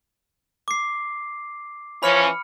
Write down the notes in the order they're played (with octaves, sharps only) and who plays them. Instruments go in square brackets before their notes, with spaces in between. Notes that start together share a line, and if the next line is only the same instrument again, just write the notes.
[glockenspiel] D6 C7
[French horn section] E3 F3 C#4 [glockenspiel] B5 F6 C#7